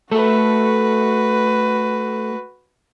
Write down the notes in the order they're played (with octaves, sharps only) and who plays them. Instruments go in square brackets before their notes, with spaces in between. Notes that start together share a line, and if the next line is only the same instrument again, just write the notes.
[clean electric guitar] A3 A4 [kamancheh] F#4 B4